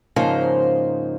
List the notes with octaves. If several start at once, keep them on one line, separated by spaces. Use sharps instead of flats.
G#2 C#3 F3 A#3 D#4 C5